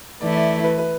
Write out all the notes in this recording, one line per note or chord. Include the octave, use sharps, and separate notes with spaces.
E3 A3 E4 D5
D5
B4
B4